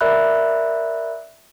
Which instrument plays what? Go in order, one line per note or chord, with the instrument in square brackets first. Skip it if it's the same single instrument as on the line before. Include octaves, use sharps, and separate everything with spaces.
[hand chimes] A#4 D5 E5 B5 F#6